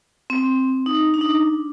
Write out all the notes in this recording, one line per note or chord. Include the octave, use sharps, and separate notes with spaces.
C4
D#4
D4
D#4
D4